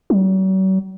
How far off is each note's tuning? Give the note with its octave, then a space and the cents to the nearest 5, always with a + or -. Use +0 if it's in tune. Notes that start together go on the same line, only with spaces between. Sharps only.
F#3 +45